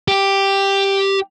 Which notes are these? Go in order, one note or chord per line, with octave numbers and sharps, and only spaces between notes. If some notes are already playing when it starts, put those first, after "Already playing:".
G4